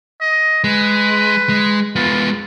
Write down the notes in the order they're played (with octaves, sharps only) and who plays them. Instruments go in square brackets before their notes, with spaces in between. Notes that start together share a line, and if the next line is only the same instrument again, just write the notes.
[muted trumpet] D#5
[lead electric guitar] G#3 [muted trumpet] B4
[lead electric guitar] G#3
[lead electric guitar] G#3 B3 [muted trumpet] F4